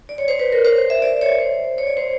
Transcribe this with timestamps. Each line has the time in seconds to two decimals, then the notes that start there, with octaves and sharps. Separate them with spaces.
0.09 D5
0.18 C#5
0.28 C5
0.40 B4
0.52 A#4
0.65 C5
0.77 C5
0.90 E5
1.02 D5
1.21 C#5
1.40 C5
1.78 C#5
1.87 D5
1.97 C5